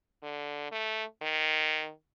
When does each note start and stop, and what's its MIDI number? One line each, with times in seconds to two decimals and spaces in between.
0.23 0.69 50
0.72 1.04 57
1.22 1.91 51